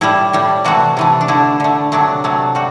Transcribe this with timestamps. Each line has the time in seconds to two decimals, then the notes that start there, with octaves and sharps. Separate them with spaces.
0.01 A2 G3 E4
0.33 A2 G3
0.64 C3 E3 A3 F#4
0.97 C3 E3 A3
1.21 D4
1.28 D3 A3 E4
1.60 D3 A3
1.92 C3 F#3 A3 D4
2.24 C3 F#3 A3
2.55 G3 F#4